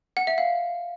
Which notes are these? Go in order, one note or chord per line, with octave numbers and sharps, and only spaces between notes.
F#5
E5
F5